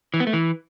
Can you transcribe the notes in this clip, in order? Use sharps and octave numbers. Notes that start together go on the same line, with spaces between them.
E3
B3
A3
E3